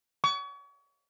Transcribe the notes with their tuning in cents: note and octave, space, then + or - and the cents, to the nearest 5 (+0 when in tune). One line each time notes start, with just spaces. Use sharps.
C#6 +35